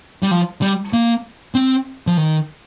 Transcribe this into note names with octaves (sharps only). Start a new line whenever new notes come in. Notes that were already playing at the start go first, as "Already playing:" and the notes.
G3
F3
G3
A#3
C4
F3
D#3